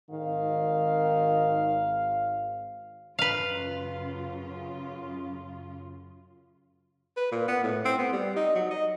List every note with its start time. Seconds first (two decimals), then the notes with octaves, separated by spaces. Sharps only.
0.11 G#1 D#3 F5
3.19 F#2 C#3 F4 B4 F5
7.17 B4
7.32 A#2
7.48 B3
7.63 A2
7.85 C4
7.98 B3
8.12 G3
8.36 D#4
8.55 F#3
8.71 D#5